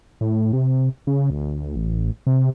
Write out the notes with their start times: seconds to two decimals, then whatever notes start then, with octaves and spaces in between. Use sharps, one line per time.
0.21 A2
0.53 C3
1.07 C#3
1.30 D2
1.76 A1
2.27 C3